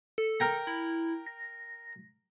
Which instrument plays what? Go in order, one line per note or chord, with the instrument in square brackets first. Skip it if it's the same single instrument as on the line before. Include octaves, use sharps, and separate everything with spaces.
[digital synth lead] A4
[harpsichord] A#4 G5 A#5
[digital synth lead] E4
A#6